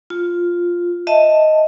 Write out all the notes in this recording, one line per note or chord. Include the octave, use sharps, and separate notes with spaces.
F4
D#5 E5 A5